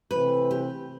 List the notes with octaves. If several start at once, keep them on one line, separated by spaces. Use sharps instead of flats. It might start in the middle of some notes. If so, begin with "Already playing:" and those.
C3 E3 A3 C4 B4
G4